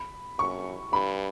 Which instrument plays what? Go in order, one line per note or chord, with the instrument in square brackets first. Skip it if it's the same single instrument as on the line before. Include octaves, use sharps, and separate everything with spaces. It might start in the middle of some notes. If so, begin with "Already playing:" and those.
Already playing: [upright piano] B5
[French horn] F#2 [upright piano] C#6
[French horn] G2 [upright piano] B5